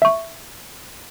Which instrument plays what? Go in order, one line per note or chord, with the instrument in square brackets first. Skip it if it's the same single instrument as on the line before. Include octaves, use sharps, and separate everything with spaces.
[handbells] E5 C#6